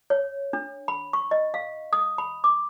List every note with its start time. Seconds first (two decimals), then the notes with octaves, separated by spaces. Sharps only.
0.10 C#5
0.53 D4
0.88 B5
1.13 C#6
1.31 D#5
1.54 F5
1.93 D#6
2.18 B5
2.44 D6